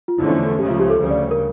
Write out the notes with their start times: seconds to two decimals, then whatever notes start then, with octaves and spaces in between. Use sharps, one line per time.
0.08 F4
0.18 E2 D3 F3 A3 C#4 E4
0.45 A4
0.59 C#2 C#3 F3 A3 G4
0.70 F4
0.80 G4
0.90 A4
1.00 D2 C#3 G3
1.10 D5
1.31 A#4